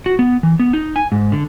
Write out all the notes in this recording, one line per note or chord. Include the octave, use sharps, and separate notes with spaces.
F#4
B3
E3
B3
D#4
G#5
G#2
D3